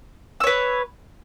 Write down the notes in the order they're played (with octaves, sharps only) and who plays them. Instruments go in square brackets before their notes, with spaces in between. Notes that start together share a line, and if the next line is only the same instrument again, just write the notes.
[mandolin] E6
C#5
B4